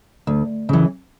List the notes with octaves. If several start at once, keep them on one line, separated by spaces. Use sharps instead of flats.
D2
C#3 E3